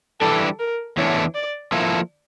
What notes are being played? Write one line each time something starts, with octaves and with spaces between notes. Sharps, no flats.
E3 G3 D4 A4
A#4
E2 E3 A3 D4 C#5
D5
F3 A#3 E4 A4